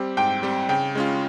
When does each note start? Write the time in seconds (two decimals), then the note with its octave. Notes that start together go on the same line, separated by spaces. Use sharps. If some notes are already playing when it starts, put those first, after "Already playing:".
Already playing: G3 C4 G4
0.17 G#2 G5
0.43 G3 C4 G4
0.69 C#3 G5
0.95 G#3 C#4 F4